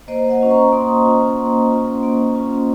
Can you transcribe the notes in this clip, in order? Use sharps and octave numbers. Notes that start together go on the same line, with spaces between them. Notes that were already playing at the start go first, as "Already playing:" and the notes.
A#3 C5 D#5
D#5 F#5
C#4 F4
A#5 C#6
A#3 C6 D#6
C#4 F4
A#3
C#4 F4
A#3
C#4 F4